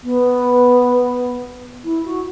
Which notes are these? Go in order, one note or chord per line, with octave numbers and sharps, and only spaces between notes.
B3
E4
F#4